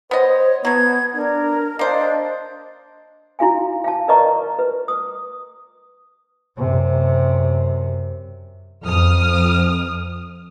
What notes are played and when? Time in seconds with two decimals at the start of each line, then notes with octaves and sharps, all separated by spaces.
0.11 B3 C5 C#5 D#5
0.65 B2 F#3 B3 G#6
1.16 D4 A#4
1.79 A#3 D4 C5 D#5
3.39 E4 F#4 F5 G#5
3.84 F5 A5
4.08 A#4 B4 D5 D#5 A#5 C#6
4.59 B4
4.88 D#6
6.58 F#2 C3
8.85 F2 D#6 F6